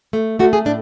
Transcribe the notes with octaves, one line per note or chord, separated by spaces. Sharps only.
A3
A3 F#4
G#4
A2 D4